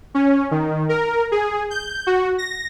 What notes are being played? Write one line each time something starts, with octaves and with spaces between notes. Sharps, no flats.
C#4
D#3
A#4
G#4
G6
F#4
A#6